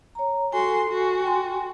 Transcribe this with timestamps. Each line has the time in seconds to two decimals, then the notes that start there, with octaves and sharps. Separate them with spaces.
0.15 C#5 A#5
0.53 F#4 A4 G#5 C6
0.89 F#4
1.22 G5 G#5 C6